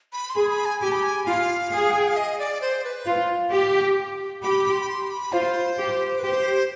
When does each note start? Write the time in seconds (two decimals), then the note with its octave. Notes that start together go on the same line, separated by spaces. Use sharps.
0.13 B5
0.30 C6
0.35 G#4 B5
0.50 B5
0.65 G#5
0.81 G4 G#5
0.92 B5
1.03 G#5
1.26 F4 F5
1.71 G#4
1.91 G#5
1.99 G5
2.08 F5
2.16 D#5
2.39 D5
2.61 C5
2.84 B4
3.07 F4
3.52 G4
4.42 G4 B5
4.65 B5
4.72 C6
4.79 B5
4.88 C6
5.10 B5
5.32 F4 C5
5.78 G4
6.19 B4
6.23 G4 C5